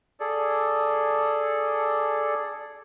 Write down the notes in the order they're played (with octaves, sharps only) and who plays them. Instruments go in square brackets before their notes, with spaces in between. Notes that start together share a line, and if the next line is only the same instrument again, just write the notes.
[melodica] G#4 A4 D5